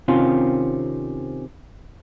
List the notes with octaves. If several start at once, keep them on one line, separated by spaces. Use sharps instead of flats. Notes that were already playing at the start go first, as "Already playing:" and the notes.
C3 D#3 C4 C#4 F4